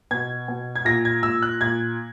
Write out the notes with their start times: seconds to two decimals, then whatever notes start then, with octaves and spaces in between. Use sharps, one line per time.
0.11 B2 G#6
0.48 B2
0.75 G#6
0.85 A#2 A#6
1.05 G#6
1.23 A#2 E6
1.42 F#6
1.61 A#2 G#6